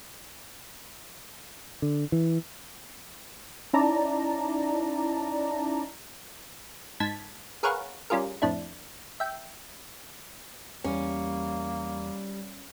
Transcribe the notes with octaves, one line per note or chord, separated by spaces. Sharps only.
D3
E3
C#4 D#4 E4 D5 A5 A#5
G#2 A5 G#6 B6
G#4 A#4 B4 C#5 F5 F#5
G3 C#4 F4 G#4 A#4
F2 A2 D4 E4
E5 G5
E2 G3 A#3 C#4